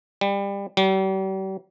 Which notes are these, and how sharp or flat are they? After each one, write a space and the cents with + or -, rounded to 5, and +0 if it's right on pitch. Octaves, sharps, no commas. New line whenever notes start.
G3 +25
G3 -40